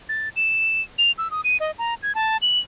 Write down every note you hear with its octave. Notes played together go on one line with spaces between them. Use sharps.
A6
E7
F7
E6
D#6
D#7
D#5
A#5
G#6
A5
F#7